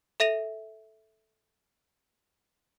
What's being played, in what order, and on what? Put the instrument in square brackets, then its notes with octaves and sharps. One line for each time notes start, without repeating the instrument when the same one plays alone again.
[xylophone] A4 E5 A#6 D#7 F7